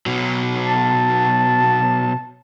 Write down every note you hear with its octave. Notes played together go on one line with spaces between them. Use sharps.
B2 F#3
A5